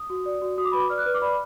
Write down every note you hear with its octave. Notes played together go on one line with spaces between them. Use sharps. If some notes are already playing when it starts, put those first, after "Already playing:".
Already playing: D#6
F#4
D5
F#4
F#4 D#6
D6
B4 B5
D6
D5 F6
F#6
B4 F6
D6
D5 B5